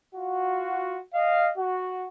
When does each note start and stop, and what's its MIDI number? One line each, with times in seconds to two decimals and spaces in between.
0.14 0.99 65
0.14 0.99 66
1.14 1.49 75
1.14 1.49 77
1.57 2.07 66